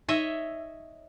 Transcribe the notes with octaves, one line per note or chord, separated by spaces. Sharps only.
D#4 C#5 D#5 E5